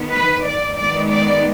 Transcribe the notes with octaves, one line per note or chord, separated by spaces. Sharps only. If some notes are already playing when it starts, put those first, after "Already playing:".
Already playing: D#3 B3
B4
D5
D#3 G#3 B3 D5
D5